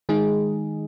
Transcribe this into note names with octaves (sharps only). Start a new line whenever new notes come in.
D#3 G#3 D#4 G#4